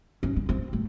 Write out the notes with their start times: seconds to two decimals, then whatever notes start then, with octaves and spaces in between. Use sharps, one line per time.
0.23 C#4
0.36 C#4
0.49 C4
0.73 A3